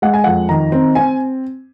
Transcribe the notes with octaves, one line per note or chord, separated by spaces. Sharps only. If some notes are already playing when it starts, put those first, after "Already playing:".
G#3 F#5
G#5
F2 F#5
D#3 A#5
C4
C4 G#5